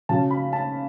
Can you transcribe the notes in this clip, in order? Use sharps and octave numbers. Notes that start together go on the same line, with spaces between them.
C#3 F#3 A5
B5
A5